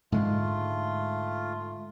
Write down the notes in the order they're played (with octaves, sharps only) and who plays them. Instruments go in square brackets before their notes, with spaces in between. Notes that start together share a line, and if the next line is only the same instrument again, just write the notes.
[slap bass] G#2 D3 G#3 [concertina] A3 F4